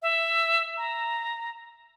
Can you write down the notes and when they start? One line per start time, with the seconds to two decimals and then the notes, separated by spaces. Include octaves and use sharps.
0.02 E5
0.77 A#5